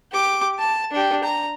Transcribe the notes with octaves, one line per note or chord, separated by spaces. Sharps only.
G4 D6
A5
D4 G4
A#5